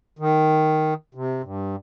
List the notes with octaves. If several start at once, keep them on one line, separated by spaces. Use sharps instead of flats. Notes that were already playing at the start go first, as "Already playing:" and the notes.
D#3
C3
G2